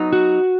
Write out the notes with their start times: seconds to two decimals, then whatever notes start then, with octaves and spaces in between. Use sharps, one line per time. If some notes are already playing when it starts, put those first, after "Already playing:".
Already playing: F#3 B3 D#4
0.13 F#4